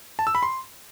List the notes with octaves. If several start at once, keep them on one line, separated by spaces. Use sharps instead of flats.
A5
E6
B5
C6